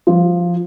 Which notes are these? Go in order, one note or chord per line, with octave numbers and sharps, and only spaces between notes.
F3